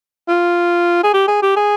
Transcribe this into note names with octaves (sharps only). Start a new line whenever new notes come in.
F4
G#4
G4
G#4
G4
G#4